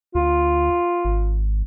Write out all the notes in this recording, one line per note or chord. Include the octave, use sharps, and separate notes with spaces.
D2 F4
G#1